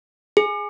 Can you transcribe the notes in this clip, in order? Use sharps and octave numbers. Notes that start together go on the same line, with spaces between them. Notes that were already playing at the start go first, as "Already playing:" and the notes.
G#4